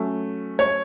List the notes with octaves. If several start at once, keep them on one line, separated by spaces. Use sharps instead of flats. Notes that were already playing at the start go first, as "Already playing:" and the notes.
Already playing: F#3 A3 C#4
C#5